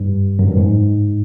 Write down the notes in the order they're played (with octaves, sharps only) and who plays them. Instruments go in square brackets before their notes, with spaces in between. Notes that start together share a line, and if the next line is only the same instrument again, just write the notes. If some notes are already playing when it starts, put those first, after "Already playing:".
Already playing: [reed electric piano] G2
F#2
G2
G#2